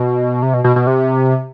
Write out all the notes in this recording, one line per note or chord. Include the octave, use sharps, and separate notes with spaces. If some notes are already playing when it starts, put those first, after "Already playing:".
Already playing: B2
C3
B2
B2
B2
C3